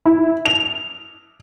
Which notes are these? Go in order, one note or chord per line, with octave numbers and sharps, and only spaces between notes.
E4
F7